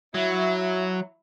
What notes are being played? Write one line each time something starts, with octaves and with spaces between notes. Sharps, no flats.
F#3 E4 E5